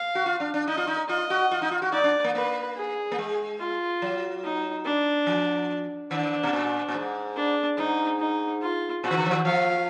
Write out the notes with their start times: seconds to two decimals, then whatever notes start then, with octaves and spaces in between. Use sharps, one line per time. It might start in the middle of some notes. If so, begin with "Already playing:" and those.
Already playing: F5
0.15 F#4
0.26 F4
0.40 D4
0.54 D4
0.67 D#4 D#5
0.77 F4
0.87 D#4
1.09 F4 D#5
1.30 F#4
1.51 F4
1.62 D#4
1.71 F4
1.82 F#4
1.92 D#4 D5
2.04 D4
2.24 A#3
2.35 A#3 B4
2.77 G#4
3.11 A#3
3.18 G#3
3.60 F4
4.02 F#3
4.44 D#4
4.85 D4
5.27 F3
6.11 D#3 D4
6.43 B2
6.53 A#2
6.89 A#2
6.95 G#2
7.36 D4
7.78 G#2 D#4
8.20 D#4
8.62 F4
9.04 A#2 F#4
9.11 D#3
9.17 D3
9.26 F3
9.31 D#3
9.45 F3 F5